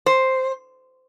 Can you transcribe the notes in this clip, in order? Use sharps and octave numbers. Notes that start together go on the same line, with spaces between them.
C5